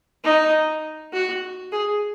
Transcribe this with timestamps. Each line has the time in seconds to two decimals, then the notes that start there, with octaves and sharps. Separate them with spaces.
0.24 D#4
1.13 F#4
1.72 G#4